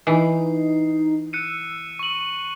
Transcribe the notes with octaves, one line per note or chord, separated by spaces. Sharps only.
E3 D#4 C7
E6 F#6 C#7 D#7
C#6 F#7